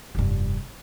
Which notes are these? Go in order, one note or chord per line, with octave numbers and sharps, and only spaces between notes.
F1 G2